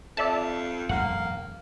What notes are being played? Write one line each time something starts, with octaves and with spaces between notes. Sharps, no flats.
F2 D5 E5 A5
E1 F#2 G#3 A#3 F#5